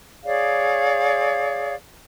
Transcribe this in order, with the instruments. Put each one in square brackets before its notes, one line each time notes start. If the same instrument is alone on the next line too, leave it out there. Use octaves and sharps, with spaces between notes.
[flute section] G#4 C#5 D5 F5